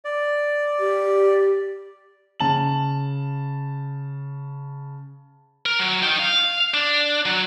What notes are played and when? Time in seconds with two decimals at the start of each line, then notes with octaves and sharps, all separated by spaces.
0.05 D5
0.79 G4
2.40 C#3 A5 F#7
5.66 A#4
5.79 F#3
6.03 D#4 G5
6.19 F5
6.74 D4
7.25 F#3